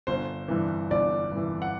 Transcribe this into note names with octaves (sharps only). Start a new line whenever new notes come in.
G1 C5
G2 E3
G1 D5
G2 E3
F#5